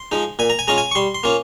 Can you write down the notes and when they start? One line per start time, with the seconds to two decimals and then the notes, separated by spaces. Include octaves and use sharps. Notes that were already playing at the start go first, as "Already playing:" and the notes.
Already playing: C6
0.12 F3 G#3 D#4
0.39 A#2 G#5
0.50 A#5
0.59 G#5
0.68 G#3 C#4 F4 A#5
0.78 G#5
0.91 C#6
0.95 G3 C6
1.15 C6
1.23 A#3 C#4 F4